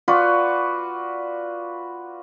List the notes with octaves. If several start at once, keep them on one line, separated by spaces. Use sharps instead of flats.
F4 F#4 B4 D5